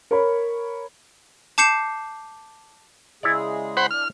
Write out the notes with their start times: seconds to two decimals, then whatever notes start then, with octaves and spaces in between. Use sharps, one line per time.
0.11 A#4 C#5 B5
1.58 A5 D6 G6 C7 C#7 E7
3.23 C#3 G#3 E4 G#4 C#5 D5
3.77 C5 F#5 B5
3.91 D4 F6